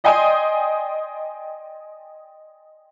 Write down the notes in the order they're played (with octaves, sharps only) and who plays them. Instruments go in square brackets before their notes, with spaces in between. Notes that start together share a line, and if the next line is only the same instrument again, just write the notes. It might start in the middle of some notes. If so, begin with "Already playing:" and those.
[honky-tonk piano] D5 D#5 G5 G#5 C6 D#6